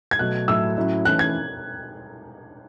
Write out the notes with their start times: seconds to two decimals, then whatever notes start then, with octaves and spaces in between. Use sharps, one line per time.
0.11 G#6
0.19 B2 F#3 A3 F#6
0.48 A2 F#3 A3 E4 E6
0.77 A2 F#3 C#4 E4
1.05 E3 A3 C#4 E4 F#6
1.19 G#6